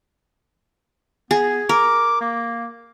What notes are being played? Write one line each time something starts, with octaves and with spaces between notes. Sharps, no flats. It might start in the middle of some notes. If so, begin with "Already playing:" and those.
B3 G#4
A#4 D6
A#3